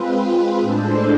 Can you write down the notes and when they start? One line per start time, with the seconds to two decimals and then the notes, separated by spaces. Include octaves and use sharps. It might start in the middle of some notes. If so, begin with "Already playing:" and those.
Already playing: G#3 C4 F4 B4
0.61 A2 G#3 D4 A4 C5